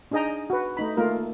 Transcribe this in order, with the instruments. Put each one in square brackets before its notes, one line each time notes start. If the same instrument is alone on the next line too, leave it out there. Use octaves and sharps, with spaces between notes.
[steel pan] D4 D#4 G#4 D#5 G5 A#5
F#4 B4
A3 D#4 B5
A3 A#3 F4 A#4